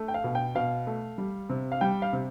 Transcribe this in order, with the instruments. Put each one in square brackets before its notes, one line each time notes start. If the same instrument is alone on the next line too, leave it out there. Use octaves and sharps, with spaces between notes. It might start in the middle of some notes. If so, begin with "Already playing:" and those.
Already playing: [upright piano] A3
G5
F5
B2
G5
B2 F5
A3
G3
C3
F5
G3 G5
F5
C3